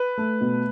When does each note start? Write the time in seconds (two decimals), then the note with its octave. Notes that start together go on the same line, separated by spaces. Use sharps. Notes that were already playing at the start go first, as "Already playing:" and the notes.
Already playing: B4
0.18 A3
0.41 B2